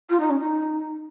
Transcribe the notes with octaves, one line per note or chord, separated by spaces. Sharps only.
F4
D#4
C#4
D#4